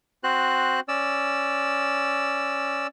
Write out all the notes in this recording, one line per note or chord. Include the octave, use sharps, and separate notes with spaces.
C4 F#4 C5 F#6
C#4 D5 E6